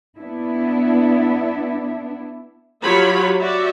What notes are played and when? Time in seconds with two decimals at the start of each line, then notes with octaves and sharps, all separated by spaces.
0.18 B3 D4 E4
2.83 F#3 F4 G4 C#5 B5
3.40 F#4 G4 D5 E5